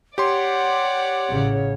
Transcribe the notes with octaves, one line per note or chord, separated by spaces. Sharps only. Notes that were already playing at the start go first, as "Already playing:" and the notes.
G4 C#5 D5 F#5 C6
A1 C#3